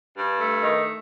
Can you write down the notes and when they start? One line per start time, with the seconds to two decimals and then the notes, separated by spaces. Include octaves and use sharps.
0.17 G2
0.40 A3
0.63 D#3